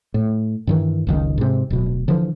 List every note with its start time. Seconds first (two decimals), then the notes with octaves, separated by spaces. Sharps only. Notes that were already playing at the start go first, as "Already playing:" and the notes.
0.14 A2
0.67 G2 D#3 E3
1.07 F#1 C#2 D#3
1.38 G#2 C3
1.70 D1 B2
2.08 D3 E3 F3